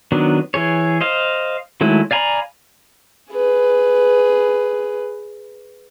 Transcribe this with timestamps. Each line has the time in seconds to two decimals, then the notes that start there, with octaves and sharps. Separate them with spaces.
0.12 D#3 F#3 B3 D4
0.54 E3 G#4 C#5
1.01 C5 D#5 F5
1.81 D#3 F#3 G#3 A3 E4
2.11 D5 F5 G#5 A#5 B5
3.30 G#4 B4